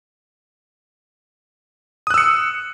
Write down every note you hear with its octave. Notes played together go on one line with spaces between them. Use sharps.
D#6 E6 F#6 C#7